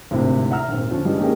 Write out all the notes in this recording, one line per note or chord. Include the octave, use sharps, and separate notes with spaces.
G#1 D2 A2 C3
E5 F#5 A#5 E6 F6
D#1 G#1 C4
D3 F3 C#4
G2 E3 F3 G3 G#3 C#4
D#3 A#3 C#4 G4 G#4 A#4